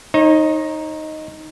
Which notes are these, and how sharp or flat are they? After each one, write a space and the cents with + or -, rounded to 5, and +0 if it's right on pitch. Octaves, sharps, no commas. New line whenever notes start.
D#4 +0 C#5 -40